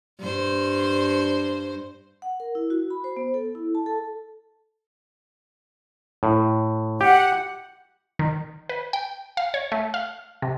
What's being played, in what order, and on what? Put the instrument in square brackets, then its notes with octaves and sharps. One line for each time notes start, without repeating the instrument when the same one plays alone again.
[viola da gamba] G2 C5
[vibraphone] F#5
A#4
E4
F#4
B5
C5
B3
A4
E4
A5
A4
[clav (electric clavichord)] A2
[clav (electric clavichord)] G4 [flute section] F#5
[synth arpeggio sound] D#3
B4
G5
F5
C#5
A3
F5
C3